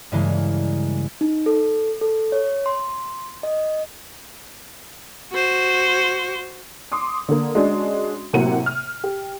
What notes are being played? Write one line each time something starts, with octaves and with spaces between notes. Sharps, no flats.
G2 C#3 E3 G#3 A#3
D#4
A4
A4
C#5
C6
D#5
F#4 C5
C6 D6 D#6
D3 A#3
G#3 C#4 D4 F#4
A2 C3 F#3 A#3 F#5 D#7
F6
G4